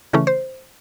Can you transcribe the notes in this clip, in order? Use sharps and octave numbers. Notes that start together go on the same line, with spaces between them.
C#3 E3 A3 C#4
C5